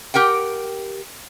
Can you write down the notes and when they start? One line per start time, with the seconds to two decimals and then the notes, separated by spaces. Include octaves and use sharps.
0.14 G4 A#4 F#5 G5